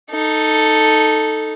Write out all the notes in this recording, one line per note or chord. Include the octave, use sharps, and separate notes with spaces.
D#4 A4